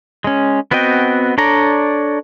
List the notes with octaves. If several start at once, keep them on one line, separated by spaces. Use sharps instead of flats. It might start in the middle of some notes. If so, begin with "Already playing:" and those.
G#3 C#4
B3 C4 F#4 D#5 G5
D4 A4 C#5 D5 A#5